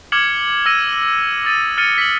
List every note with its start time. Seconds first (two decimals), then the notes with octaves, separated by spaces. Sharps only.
0.12 D6 F6 G#6 C#7 F#7
0.66 E6 A#6 D#7
1.45 D#6 A6 D#7
1.78 F6 A6 C#7 D#7
1.98 B6 F#7